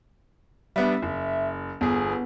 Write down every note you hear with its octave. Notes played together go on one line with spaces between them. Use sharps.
G3 B3 D4 E5
F#1
G1 B3 G#4